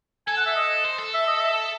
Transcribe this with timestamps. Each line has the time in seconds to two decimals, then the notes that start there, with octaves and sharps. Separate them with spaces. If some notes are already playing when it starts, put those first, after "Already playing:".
0.27 A4 G#5
0.37 F#5
0.47 E5
0.56 D#5
0.85 C5
0.99 A4
1.14 E5
1.27 D#5
1.40 E5